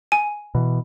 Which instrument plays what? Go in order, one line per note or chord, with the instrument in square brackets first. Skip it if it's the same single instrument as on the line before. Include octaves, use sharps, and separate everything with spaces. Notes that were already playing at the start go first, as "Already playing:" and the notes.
[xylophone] G#5
[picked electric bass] B2 E3